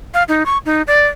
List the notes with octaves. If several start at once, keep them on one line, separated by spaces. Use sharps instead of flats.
F5
D#4
C#6
D#4
D5